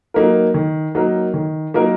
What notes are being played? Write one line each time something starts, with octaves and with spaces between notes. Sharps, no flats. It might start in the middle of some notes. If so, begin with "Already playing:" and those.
F#3 A#3 D#4 A#4
D#3
F#3 A#3 D#4 A#4
D#3
F#3 A#3 D#4 A#4